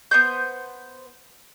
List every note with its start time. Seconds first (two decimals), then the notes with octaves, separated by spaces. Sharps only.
0.11 B3 C5 G6